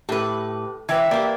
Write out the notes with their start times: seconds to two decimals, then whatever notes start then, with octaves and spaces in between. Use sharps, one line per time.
0.09 A2 G4 A4 B4
0.89 E3 B4 E5 G5 G#6
1.11 A#3 G4 D5